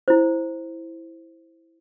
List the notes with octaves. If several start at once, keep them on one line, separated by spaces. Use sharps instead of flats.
E4 C5